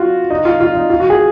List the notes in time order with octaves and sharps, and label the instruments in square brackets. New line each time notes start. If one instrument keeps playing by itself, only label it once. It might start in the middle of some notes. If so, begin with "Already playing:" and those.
Already playing: [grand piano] F4 F#4
D#4
F4
F4
D#4
F4
F#4
G#4